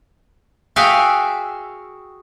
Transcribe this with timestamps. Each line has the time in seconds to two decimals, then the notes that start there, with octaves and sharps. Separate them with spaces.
0.76 F#4 G#4 E5 F5 G5